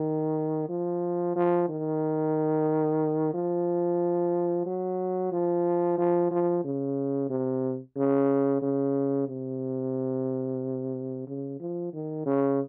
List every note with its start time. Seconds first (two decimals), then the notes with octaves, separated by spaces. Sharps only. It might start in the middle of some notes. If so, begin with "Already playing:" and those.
Already playing: D#3
0.69 F3
1.36 F3
1.68 D#3
3.34 F3
4.66 F#3
5.32 F3
5.98 F3
6.31 F3
6.64 C#3
7.30 C3
7.97 C#3
8.62 C#3
9.28 C3
11.27 C#3
11.60 F3
11.93 D#3
12.26 C#3